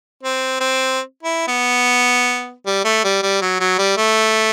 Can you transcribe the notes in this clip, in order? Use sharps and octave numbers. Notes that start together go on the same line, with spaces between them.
C4
C4
E4
B3
G3
A3
G3
G3
F#3
F#3
G3
A3